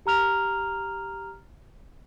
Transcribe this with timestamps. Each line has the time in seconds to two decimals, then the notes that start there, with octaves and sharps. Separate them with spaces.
0.06 G4 A#5 F6 F7